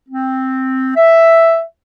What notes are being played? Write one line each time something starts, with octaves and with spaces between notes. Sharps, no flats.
C4
E5